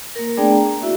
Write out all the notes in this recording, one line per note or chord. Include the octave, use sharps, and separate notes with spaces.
A#3 A#4
A3 B3 D4 G#4 D5 G5
A#5
E4 F#4 E5